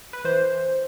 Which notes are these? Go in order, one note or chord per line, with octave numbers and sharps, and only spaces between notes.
B4
E3 C5